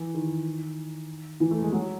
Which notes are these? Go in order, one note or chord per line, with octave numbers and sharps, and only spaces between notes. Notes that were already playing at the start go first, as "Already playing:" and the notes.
Already playing: E3
D#3
E3
A3
G#3
F#3